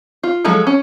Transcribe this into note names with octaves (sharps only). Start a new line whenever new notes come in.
F4
F3 F#3 G#3 A4
C#4